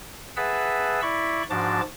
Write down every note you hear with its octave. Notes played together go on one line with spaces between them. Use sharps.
G#4 B4 E5 F#5 A5 E6
E4 D5 B5 C#6
G#2 F3 D4 F#4 A5 D6